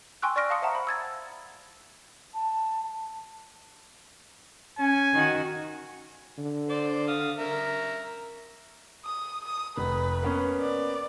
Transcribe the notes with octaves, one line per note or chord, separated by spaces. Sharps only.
G5 G#5 C6 C#6 E6 F#6
D5 C#6 F6 A#6 D7
F5 A5 C6 D#6 C#7
C5 E5 F#5 A5 A#5
B5
E6 G#6 A6
A5
C#4 G#5
D#3 F#4
D3
C5 D5
F5 D#6
A#4 E5
D#6
D#6
F1 B4
A#3 B3 C#4
D5